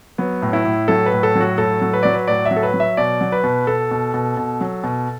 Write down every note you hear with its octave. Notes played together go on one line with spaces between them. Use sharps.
F#3 B3
A2
E4
A2
F#3 A4
B4
A2
A4
F#3
F#4
A2 A4
F#3
B4
F#3 D5
B4
A2 D5
E5
F#3
A4
B4
F#3
E5
B2 D5
F#3
B4
B2
B2 A4
B2
B2
B2
F#3
B2